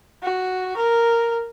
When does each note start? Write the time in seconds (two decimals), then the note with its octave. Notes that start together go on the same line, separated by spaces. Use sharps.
0.23 F#4
0.77 A#4